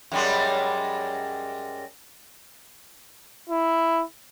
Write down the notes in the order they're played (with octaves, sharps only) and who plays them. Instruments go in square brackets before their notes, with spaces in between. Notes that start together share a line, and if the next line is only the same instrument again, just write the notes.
[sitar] F#2 G3 G#3
[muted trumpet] E4